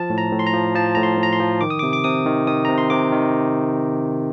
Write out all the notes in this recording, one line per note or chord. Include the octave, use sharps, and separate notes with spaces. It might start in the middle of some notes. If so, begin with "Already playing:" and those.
Already playing: F3 A5
A2
A#5
A2
C6
A#5
F3
F3 A5
A2 A#5
C6
A2
A#5
C6
F3
D#3 D6
D#6
C3 D6
D6
C3 D#6
D#3
D#3 D#6
C3 A#5
C6
C3 D6
D#3